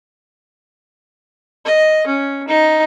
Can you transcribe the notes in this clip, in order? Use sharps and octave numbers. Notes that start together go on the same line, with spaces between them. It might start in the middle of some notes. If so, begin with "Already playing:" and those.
D#5
C#4
D#4